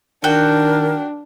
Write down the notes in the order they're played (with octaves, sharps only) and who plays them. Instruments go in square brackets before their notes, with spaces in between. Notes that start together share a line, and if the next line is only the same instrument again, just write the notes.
[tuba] D#3 [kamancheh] D4 [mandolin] F#4 G5 [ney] A#4